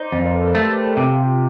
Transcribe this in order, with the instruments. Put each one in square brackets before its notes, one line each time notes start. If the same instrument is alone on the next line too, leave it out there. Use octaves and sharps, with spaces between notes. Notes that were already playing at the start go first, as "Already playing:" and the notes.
Already playing: [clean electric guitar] D#4 [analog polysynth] C5 D5
[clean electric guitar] F2
[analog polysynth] A#4
A4 B4
[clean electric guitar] A3 [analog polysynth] G4 A4
[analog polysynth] G4 A4
[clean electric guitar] C3 [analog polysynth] F4 G4